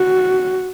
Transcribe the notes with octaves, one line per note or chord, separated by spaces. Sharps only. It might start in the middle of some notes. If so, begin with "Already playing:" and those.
Already playing: F#4